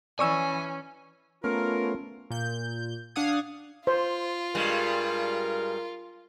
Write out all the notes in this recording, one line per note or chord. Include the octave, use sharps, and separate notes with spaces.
E3 C#4 D5 G#5 C#6 E6
A3 B3 C#4 F4 A#4
A#2 G6
D4 F5 F#5 D#6 G#6
F4 C5
G2 G3 G#3 A#4